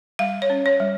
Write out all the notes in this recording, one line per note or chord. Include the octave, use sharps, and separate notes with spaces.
G3 F5
C#5
C#4
C#5
G3